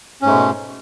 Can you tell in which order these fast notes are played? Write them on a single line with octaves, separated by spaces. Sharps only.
C#4 G#2 A3 G#3 B2